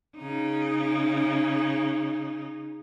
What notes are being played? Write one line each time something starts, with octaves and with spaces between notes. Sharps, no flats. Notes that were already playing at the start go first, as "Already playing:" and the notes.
C#3 D#4